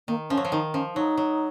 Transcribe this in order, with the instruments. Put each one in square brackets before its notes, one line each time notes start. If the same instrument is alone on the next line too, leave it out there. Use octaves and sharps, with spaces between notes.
[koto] D#3 [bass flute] A#3
[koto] F3 [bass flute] C#4
[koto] F#3
F3
[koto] D#3 [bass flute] D#4
[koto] F3 [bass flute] C#4
[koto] F#3 [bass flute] D#4
[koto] F#3